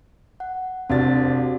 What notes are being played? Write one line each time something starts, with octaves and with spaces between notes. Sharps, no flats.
F#5
F1 C4 D4 F#4 A6